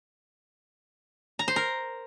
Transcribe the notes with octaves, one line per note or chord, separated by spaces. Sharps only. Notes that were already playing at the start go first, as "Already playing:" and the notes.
A#5
C5
A#4